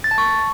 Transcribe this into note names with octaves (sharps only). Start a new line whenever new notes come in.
A6
A5
C#6